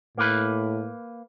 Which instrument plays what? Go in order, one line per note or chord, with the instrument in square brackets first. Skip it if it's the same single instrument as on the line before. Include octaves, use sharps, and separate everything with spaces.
[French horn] A2 [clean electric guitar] A#3 B4